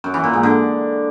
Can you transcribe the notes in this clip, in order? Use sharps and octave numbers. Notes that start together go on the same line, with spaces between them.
F#2
E3
A#2
G#2
D3